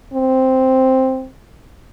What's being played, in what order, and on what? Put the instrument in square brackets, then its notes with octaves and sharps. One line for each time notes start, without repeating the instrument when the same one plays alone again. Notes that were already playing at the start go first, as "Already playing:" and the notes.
[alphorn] C4